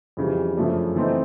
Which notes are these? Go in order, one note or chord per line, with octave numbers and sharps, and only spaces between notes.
F2 C#3 E3 G3
F#2 C#3 F3 A3 D4
E3 A3 C4 D#4